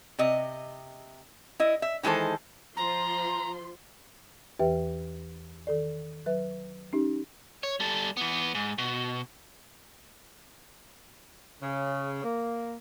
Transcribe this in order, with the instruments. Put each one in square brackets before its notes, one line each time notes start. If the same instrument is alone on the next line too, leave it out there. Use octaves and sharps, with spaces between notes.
[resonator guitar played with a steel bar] C3 D#5
E4 D#5
E5
D#3 E3 G#3 A4 C5
[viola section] F3 C6 [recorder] A#5
[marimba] E2 E3 G4 B4 E5 G5
D#3 A4 D5
F#3 B4 E5
C#4 D#4 G4
[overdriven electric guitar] C#5
G3 A4
E3 B3
G#2
B2
[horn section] C#3
A#3